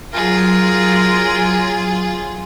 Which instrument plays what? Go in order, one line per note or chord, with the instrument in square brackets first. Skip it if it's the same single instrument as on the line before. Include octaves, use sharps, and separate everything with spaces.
[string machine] F#3 [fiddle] F4 G#4 [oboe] A#4